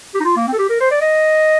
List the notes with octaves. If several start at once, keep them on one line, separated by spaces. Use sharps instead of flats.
G4
D#4
F4
A#3
C4
A4
G4
A#4
C5
D5
D#5